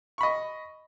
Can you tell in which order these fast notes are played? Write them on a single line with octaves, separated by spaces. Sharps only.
C#6 B5 D#5